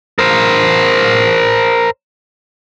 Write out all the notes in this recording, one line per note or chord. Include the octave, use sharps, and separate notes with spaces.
A#4 C5